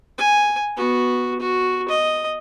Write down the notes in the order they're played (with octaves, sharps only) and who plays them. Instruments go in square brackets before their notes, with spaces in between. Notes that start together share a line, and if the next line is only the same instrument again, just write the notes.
[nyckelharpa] G#5
B3 F#4
F#4
D#5